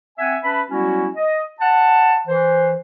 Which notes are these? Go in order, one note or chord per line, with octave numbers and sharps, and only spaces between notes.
C4 E5 F#5 G#5
C#4 B4 E5 A5 B5
F#3 G3 B3 C#4 E4 F#4
D#5
F#5 A5
E3 C5